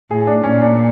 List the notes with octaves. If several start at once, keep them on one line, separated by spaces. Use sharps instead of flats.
A2 G#4
D4
A#2 C#4
D4